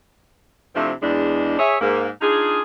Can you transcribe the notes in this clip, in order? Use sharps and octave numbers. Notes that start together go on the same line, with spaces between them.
C3 F3 A3 C4 D4 E4
E2 G#3 D4
G#4 C#5 E5
G#2 A#3
D4 D#4 F4 G#4